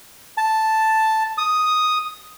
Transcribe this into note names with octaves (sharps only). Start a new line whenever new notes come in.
A5
D#6